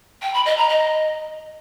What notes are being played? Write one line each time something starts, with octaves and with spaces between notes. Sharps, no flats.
G5
B5
D#5
A#5
D#5